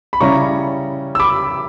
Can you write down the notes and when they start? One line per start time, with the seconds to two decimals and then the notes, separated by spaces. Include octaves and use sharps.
0.13 B5
0.20 C#3 G3 C#4 E4 A#5 C#6
1.15 E6
1.20 B5 D6